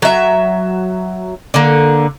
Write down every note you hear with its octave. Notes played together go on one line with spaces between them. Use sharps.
F#3 E5
D3 A#3